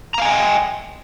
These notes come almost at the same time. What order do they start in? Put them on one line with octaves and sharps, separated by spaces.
A#5 F5 G#5 D#5 G5